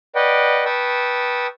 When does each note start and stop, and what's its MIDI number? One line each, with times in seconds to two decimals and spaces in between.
0.15 0.64 71
0.15 0.64 74
0.15 0.64 75
0.15 0.64 78
0.15 0.64 79
0.65 1.47 71
0.65 1.47 79
0.65 1.47 81
0.65 1.47 85
0.65 1.47 87
0.65 1.47 88